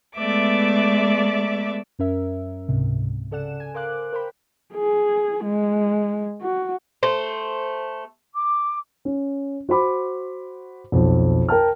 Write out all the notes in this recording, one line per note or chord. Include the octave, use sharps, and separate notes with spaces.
G#3 A3 B3 D5 E5 D6
F#2 C#4 A#4 E5
C#2 G#2 C3
C#3 A4 D5 F#5 E7
G#5
A#4 C5 F5 D6 F#6
A#4 C5 G5 B5
G#4
G#3
F#4
A3 C5
D6
C#4
F#4 C5 B5 D6
B1 F2
A#4 G5 A5 F6